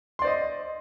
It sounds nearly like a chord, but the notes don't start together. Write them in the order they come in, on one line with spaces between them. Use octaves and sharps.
C6 D5 C5 D#5